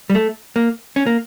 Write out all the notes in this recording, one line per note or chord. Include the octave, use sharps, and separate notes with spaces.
G3
A3
A#3
C#4
A#3